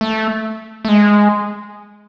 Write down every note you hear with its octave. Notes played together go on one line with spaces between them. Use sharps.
A3
A3
G#3